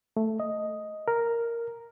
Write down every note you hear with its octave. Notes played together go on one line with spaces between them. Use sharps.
A3
D#5
A#4